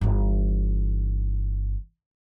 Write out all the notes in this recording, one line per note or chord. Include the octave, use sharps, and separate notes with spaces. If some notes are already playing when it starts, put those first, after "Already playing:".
G1 E3